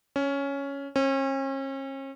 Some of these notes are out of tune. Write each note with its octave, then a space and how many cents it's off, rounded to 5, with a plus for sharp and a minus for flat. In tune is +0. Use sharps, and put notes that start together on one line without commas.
C#4 +5
C#4 -40